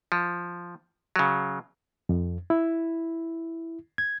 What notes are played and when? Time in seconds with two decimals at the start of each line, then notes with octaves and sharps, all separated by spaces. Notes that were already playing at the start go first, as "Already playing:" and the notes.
0.12 F3
1.16 C#3 F#3
2.09 F2
2.50 E4
3.98 G#6